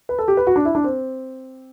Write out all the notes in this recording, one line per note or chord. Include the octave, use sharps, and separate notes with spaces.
B4
A4
G4
B4
F#4
D4
E4
D4
C4